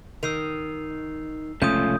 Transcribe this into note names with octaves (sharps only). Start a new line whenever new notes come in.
D#3 E6 C7 F7
F1 C#2 A#2 A3 C#4 F4 D#6 G6